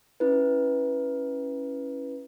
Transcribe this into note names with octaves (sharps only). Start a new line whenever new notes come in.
C#4 E4 B4